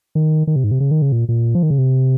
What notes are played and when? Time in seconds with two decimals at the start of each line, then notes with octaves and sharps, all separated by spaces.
0.15 D#3
0.47 D#3
0.56 C3
0.64 G#2
0.71 C3
0.80 C#3
0.91 D#3
1.02 C#3
1.12 A#2
1.29 A#2
1.55 F3
1.63 D#3
1.70 C#3
1.78 C3